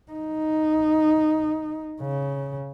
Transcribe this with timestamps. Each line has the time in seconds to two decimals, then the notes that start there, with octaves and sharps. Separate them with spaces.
0.11 D#4
2.01 C#3